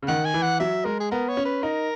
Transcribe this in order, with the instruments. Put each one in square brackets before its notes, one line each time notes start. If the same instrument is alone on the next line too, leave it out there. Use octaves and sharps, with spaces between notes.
[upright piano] C#3
[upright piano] D#3 [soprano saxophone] F#5
[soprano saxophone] G#5
[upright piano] E3
[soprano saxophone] F#5
[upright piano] F#3 [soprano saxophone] E5
[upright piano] G#3 [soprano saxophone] A#4
[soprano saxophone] G#4
[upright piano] B3 [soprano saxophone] A#4
[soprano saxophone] C#5
[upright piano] C#4
[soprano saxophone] B4
[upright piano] D#4 [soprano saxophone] A#4